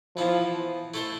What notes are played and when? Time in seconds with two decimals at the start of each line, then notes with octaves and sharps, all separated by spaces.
0.16 E3 F3 B3 E4
0.94 A3 E4 A4 C5 E5